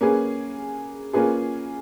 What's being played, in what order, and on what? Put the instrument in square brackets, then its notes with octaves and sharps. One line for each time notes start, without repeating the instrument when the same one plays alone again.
[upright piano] A#3 C#4 G#4 B4
A#3 C#4 F4 G#4 B4